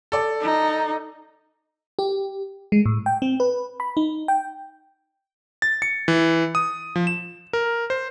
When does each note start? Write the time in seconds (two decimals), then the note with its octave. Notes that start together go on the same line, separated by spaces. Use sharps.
0.12 A4 D5
0.42 D#4
1.99 G4
2.72 G#3
2.86 A2
3.06 G5
3.22 C4
3.40 B4
3.80 B5
3.97 D#4
4.28 G5
5.62 A6
5.82 C#7
6.08 E3
6.55 D#6
6.96 F3
7.07 E7
7.53 A#4
7.90 C5